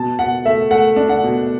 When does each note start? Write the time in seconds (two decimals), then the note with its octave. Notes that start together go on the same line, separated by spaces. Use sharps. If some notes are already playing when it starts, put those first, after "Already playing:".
Already playing: B2 A5
0.19 B2 F#5
0.45 A3 E5
0.70 A3 F#5
0.96 D4
1.09 F#5
1.24 B2